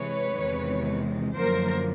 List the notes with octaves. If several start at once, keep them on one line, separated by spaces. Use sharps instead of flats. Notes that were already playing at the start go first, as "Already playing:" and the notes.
Already playing: C3 E3 G#3 B4 C#5
E2 C3 D#3 G#3
F#2 D3 F3 A#3 A#4 C5